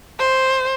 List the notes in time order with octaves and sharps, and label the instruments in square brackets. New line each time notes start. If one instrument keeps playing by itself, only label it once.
[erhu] C5